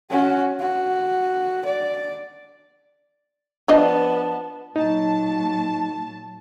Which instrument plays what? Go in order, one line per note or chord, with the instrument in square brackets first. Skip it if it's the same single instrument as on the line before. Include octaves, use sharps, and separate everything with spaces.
[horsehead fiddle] C#4 F#4
F#4
D5
[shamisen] F3 D4 D#5 [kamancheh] B3 A5
[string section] A#2 F#3 A5 [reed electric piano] D#4